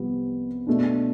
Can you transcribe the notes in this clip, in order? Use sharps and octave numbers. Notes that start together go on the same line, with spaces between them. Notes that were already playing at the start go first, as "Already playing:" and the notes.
Already playing: C2 C3 F3 B3
B2 A3 D4